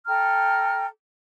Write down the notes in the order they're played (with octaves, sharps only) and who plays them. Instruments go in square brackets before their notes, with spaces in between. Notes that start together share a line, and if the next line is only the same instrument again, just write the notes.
[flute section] A4 G5 A#5 F6